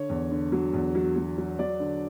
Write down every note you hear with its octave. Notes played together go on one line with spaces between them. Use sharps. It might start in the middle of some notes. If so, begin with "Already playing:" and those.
Already playing: D3 C#5
E2
D3
F#3
E2
F#3
F#3
F#3
F#3 D5
D3